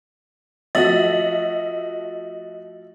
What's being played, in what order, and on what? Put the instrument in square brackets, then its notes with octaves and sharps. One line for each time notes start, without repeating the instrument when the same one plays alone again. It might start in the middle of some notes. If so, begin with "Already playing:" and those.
[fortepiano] F3 A3 F#4 [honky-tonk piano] D#5 E5 [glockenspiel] A6 F#7